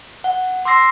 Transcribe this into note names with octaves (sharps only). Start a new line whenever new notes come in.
F#5
C6 D6 E6 A#6 C7